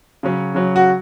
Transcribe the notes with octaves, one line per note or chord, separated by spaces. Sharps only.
C#3 F#3 C#4
C#3 F#3 C#4
F#4